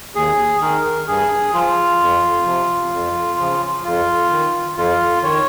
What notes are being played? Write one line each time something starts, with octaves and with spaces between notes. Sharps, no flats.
D#2 G#4
D#3 A#4
G2 G#4
F3 F4
F2
C3 F3
F2
C#3 F3
F2 F4
D#3
F2 F4
D#3 C#5